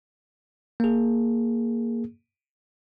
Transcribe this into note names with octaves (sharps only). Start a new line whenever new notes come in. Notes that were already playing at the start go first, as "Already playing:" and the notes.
A#3 G#4